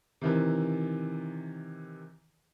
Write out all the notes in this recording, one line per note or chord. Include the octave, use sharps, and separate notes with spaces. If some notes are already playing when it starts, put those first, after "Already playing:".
C3 D#3 E3